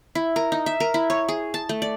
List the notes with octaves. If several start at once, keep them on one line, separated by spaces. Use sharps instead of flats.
E4
A#4
D#4
E5
A#4
E4
C#5
G#4
A5
A3
D5